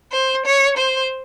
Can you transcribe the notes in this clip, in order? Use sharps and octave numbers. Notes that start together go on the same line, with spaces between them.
C5
C#5
C5